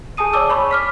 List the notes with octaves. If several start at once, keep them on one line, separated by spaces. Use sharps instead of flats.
G#4 G#5 A5 D#6 D#7
C#5 D5 A5 D6 E6
C#5 B5 C#6
D6 F6 B6